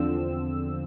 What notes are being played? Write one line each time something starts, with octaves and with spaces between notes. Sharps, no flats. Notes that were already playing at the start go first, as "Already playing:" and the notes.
Already playing: E2 D3 F3 C4 E6